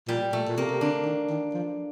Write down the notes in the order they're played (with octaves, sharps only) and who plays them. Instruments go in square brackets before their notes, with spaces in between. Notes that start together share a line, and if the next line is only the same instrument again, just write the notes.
[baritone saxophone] A#2 [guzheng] G3
[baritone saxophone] A#2 [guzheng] A3
[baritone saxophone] A#2
[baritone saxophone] C3 [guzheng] A#3
[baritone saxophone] C3
[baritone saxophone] D3 [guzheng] D4
[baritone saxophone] D#3
D#3
F3